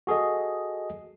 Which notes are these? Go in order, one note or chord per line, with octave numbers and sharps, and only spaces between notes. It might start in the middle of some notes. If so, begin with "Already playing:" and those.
F#4 G#4 A4 D#5